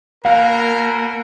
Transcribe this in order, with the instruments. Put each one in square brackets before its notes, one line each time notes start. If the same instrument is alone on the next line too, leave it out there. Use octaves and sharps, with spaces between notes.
[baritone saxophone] B2 [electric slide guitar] A#3 [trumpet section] A#4 [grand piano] F5